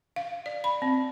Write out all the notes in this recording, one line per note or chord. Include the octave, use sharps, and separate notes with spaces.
F5
D5
B5
C4